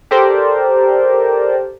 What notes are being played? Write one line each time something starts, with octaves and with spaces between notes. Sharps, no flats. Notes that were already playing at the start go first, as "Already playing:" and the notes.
G4 A4 A#4 C5 D5